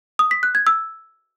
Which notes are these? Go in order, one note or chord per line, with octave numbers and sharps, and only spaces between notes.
D#6
B6
F#6
G#6
E6